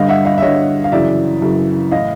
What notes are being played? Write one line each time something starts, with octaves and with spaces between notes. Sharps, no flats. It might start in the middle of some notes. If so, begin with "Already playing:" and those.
Already playing: G2 D3 D#5 F5
E5 F#5
D#5 F5
E5
G2 D3 C#5 D#5
F5
F#2 C#3 E3 D5 E5
F#2 C#3 E3
A2 E3 D#5 F5